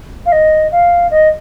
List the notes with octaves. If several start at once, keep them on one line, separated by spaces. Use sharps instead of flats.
F5
D#5
F5
D#5